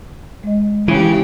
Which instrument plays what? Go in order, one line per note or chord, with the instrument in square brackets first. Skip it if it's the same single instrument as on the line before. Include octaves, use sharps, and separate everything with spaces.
[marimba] G#3 D#5
[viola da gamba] C#3 G4 [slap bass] E3